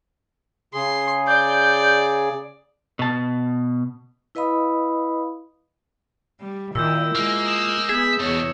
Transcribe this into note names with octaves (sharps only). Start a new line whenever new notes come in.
C#3 G#4 C6
D5 G6
B2 A5
E4 B4 D#5 F5 B5 D#6
G3
A#2 D#3 E4 E6 G6
G#3 A#3
D#6 E7
B3 G#4 E5
E2 B2 C#5